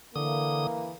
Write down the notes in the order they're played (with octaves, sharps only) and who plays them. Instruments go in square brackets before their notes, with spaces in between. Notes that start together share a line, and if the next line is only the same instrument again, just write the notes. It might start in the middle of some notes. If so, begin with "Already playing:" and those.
[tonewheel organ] D3 D#6 [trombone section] E3 A#3